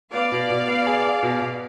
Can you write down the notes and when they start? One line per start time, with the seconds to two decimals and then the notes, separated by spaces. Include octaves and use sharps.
0.13 B3 D5 F5
0.32 B2
0.50 B2
0.68 B3
0.87 G#4
1.05 G#4
1.23 B2
1.41 B2